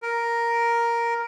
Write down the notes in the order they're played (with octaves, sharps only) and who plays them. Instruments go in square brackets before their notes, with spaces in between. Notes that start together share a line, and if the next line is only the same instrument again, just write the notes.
[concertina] A#4